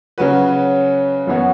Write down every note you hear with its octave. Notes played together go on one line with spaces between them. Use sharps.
C#3 F#3 C#4 F#4 B4
F#2 E3 B3 F#4 C#5